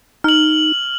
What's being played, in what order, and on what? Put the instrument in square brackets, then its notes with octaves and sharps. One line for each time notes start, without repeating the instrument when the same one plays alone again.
[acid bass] D#4 [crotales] F6 F#7